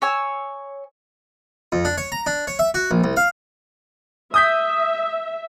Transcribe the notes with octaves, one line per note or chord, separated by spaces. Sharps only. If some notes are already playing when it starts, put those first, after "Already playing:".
C#5 G#5 E6
F2
D4
C#5
A#5
D4
C#5
E5
F#4
A#1
C2
F5
E5 D#6 G6 B6